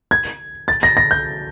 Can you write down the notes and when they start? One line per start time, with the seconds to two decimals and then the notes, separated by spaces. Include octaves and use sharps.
0.11 G#6
0.68 A6
0.83 A#6
0.97 A#6
1.11 G6